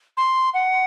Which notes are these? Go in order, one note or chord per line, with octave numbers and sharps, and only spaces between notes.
C6
F#5